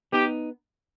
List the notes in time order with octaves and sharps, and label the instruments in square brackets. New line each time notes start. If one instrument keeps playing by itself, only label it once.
[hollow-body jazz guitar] B3 D#4 [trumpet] G4